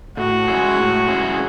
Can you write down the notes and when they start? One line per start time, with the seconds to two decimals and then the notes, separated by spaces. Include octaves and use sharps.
0.17 A2 F#4
0.47 G#3 C#4 E4 G#4
0.77 A2
1.08 G#3 C#4 E4 G#4